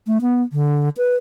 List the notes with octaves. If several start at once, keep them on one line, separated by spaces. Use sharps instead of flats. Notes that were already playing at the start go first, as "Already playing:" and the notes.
A3
B3
D3
B4